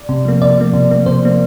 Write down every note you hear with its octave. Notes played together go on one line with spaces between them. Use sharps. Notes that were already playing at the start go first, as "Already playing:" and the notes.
Already playing: D5
C3
F3 A#3
C3 D5
F3 A#3
C3
F3 A#3
C3 C5
F3 A#3